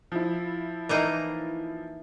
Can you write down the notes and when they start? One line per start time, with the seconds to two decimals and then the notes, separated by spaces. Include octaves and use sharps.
0.12 F3 E4
0.89 E3 A#3 D#4